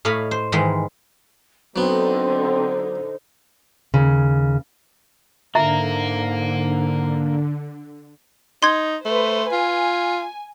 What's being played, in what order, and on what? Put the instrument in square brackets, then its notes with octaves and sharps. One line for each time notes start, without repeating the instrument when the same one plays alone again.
[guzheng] A2 C#5 D#5 F5 B5
C5
G#2 D#3 E3 G#3
[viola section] D3 D#4 [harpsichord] F#3 B3 [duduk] C4 [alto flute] C5
[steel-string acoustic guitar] D#2 C#3
[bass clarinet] G#2 [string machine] D3 [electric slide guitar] A#3 A#4 [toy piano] E5 A#5
[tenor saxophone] D#4 [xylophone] C6 G#6
[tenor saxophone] A3 [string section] B4 C5
[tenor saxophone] F4 [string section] G#5